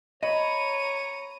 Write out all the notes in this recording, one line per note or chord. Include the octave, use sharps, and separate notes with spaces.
C#5 D#5 A#5 B5 D#7